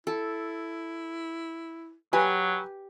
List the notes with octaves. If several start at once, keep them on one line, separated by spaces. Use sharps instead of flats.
E4 A4
F#3 G4 B4 G#5